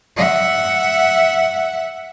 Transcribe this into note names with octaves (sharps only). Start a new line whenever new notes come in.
E5 F#5